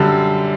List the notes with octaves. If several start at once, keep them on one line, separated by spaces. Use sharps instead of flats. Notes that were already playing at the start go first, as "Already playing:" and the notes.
Already playing: F#2 D3 G3